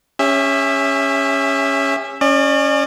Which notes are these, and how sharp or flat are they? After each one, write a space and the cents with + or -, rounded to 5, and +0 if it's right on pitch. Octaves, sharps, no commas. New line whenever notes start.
C#4 +0 G4 +45 E5 +0
C#4 +0 D5 +40